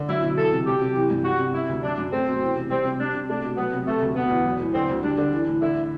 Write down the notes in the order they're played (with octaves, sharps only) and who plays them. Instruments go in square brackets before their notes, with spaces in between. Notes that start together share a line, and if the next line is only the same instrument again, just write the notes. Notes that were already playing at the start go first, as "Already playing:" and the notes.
Already playing: [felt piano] D3
[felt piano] F#3 [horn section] E4
[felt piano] B2
[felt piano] E3 [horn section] A4
[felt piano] C3
[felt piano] F#3 [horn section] G4
[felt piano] C3
E3
G2
[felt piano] G3 [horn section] F#4
[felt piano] C3
[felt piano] C3 [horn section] E4
[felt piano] D2
[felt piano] F#3 [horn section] D4
[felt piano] F#2
[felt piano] A3 [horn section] C4
[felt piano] B2
E3
C3
[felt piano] G3 [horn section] C4
[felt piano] C3
[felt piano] G3 [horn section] D4
[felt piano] C3
[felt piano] A3 [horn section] D4
[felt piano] B2
[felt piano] F#3 [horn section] B3
[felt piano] C3
[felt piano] C3 [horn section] A3
[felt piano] D2
[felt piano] B2 [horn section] B3
[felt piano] E2
F#3
A2
[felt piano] D3 [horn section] C4
[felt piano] D2
[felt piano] G3 [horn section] D4
[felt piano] D3
E3
A2
[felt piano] D3 [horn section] E4